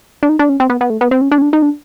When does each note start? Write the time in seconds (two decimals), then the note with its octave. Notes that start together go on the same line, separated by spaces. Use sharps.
0.23 D4
0.29 D#4
0.39 D4
0.49 C#4
0.60 C4
0.70 B3
0.81 B3
0.90 A3
1.01 B3
1.11 C4
1.21 C#4
1.32 D4
1.38 C#4
1.42 D4
1.53 D#4
1.62 D4